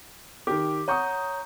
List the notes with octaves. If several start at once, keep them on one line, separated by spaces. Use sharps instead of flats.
D#3 G4 D6
C#5 F#5 A#5 C#6 D#6 G6